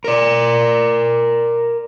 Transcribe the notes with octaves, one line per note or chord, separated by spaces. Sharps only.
A#4 D5